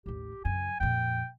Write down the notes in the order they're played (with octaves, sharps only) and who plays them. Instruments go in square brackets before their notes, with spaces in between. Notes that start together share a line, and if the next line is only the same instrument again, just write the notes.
[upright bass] A1 D#2 [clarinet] G4
[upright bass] F#2 C#3 [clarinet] G#5
[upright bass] F2 A#2 [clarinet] G5